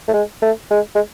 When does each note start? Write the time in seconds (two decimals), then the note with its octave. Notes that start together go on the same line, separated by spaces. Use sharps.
0.08 A3
0.14 G#3
0.42 A3
0.71 G#3
0.95 G#3